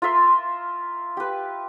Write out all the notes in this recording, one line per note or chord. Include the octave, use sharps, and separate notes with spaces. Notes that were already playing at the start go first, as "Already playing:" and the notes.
F4 A#4 E5 C6
G4 B4